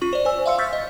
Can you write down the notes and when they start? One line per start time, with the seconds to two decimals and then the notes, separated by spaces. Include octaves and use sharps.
0.01 C#4 F4 C#6 F#7
0.13 C5 D5
0.25 C5 G#5 E6
0.46 E5 F5 C6 E6 C#7
0.58 C#6 E6 F6 G6 A6 B6
0.73 D#5